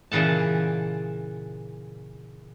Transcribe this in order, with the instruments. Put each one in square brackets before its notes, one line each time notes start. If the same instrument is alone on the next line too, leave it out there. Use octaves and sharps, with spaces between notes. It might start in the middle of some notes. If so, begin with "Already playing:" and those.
[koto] A#2 C#3 E3 F#5 A5